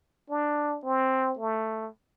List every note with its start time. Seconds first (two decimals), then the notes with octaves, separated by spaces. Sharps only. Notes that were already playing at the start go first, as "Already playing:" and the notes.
0.30 D4
0.85 C4
1.39 A3